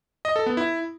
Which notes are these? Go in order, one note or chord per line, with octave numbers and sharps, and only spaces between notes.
D#5
A4
B3
E4